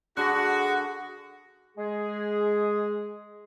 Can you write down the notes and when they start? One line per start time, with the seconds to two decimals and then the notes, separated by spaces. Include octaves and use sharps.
0.17 D3 F#4 G#4 F#6 A#6
1.76 G#3 G#4